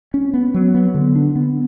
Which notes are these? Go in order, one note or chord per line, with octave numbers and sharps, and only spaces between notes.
C#4
B3
F#3
B3
D3
D4
B3